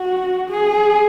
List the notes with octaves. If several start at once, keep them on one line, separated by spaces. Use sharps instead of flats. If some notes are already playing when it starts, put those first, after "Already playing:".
Already playing: F#4
G#4